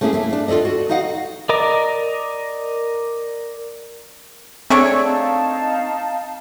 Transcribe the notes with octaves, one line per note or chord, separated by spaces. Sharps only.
A3 A#3 C#4 E4 G4 G#4
A3 A#3 E4
D4
D#2 F4 A4 D5 D#5
F#4
D#4 F#4 D#5 F5 F#5
A#4 D5 D#5 A#5 D6
A3 C4 D4 G#4 C#5 E6
D#4 F5 A5